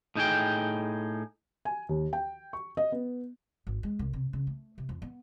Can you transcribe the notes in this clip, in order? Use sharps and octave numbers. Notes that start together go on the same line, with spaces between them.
A2 D#4 G#4 G5
G#5
D#2
G5
C#6
D#5
B3
G#1
G#3
C2
C3
C#3
A3
C3
F2
B3